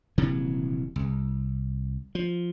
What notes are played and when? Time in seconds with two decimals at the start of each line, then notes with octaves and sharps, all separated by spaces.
0.18 D#1 C3 E3 F#3
0.96 C2
2.15 F3